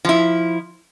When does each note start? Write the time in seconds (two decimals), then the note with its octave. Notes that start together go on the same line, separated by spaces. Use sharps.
0.05 F3 E4